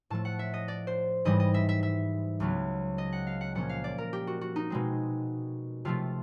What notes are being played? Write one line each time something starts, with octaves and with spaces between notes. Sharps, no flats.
A2 F3 A3 A5
F#5
E5
D#5
D5
C5
G#2 E3 G3 D#5
D#5
E5
E5
E5
C#2 C#3 F#3 B3
D#5
F#5
F5
F#5
A#2 F3 A#3 C#4 F#5
F5
D5
A#4
G4
F#4
F#4
D#4
B2 G#3 C4
C3 F3 A3 F4